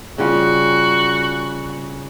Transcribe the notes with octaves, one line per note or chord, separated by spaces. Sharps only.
C#3 G3 F4 F#4